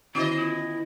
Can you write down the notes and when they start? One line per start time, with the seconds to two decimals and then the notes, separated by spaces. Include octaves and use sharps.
0.15 D3 D#3 B3 E4 F#4 D#5
0.37 E4 F4